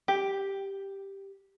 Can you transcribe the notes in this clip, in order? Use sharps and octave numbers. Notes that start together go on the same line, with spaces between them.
G4